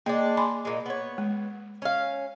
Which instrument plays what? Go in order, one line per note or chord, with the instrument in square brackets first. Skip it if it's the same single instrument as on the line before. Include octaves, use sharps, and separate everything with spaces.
[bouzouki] G#3 D4 [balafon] A#3
[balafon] G#5 B5 C6
[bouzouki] A#2 G#3
B3 C#5
[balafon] G#3
[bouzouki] C#4 F5